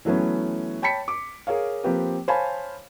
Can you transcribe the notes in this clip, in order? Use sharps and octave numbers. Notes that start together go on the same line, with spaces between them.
E3 F#3 A3 B3 C#4
C#5 G5 A5 B5 B6 C#7
D6
G#4 A#4 C#5 F5
F3 A#3 C4 G4 B4
C5 C#5 F5 G#5 A5 B5